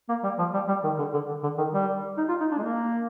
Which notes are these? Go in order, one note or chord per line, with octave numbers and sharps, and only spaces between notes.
A#3
G3
F3
G3
G3
D#3
D3
D3
D3
D#3
G3
D#4
F4
D#4
D4
G#3
A#3